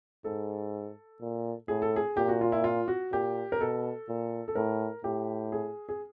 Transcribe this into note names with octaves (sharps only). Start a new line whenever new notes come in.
G#2 A4
A#2
A2 G#4
A4
G#4
A#2 G4
F#4
F4
E4
F4
F#4
A#2 G4
A#4
B2 A4
A#2
A4
A2 A#4
A2 G4
G#4
G#4